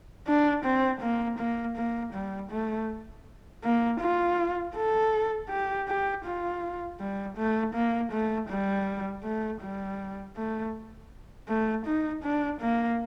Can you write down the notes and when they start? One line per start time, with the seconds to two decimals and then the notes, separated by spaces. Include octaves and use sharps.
0.27 D4
0.65 C4
1.01 A#3
1.39 A#3
1.77 A#3
2.13 G3
2.51 A3
3.64 A#3
4.00 F4
4.76 A4
5.50 G4
5.88 G4
6.25 F4
7.00 G3
7.37 A3
7.74 A#3
8.12 A3
8.49 G3
9.24 A3
9.62 G3
10.37 A3
11.48 A3
11.86 D#4
12.24 D4
12.61 A#3